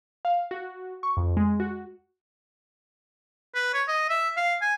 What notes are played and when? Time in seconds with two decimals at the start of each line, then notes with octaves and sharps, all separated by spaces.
0.25 F5
0.51 F#4
1.03 C#6
1.17 F2
1.37 G#3
1.60 F#4
3.55 B4
3.74 C#5
3.88 D#5
4.10 E5
4.37 F5
4.61 G#5